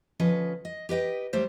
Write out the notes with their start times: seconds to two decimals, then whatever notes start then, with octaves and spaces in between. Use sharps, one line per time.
0.20 D2 F3 C#4 B4 D#5
0.65 D#5
0.89 G4 B4 D#5 G5
1.33 F#3 G3 A3 G4 C5